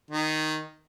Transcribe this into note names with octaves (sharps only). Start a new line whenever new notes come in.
D#3